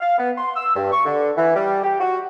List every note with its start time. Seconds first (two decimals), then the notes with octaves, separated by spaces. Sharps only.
0.01 F5
0.18 B3
0.38 C6
0.56 E6
0.76 G2
0.92 C#6
1.05 D3
1.37 E3
1.55 G3
1.83 G4
2.00 F#4